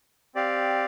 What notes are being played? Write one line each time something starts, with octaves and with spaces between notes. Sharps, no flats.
C4 G4 D5 F5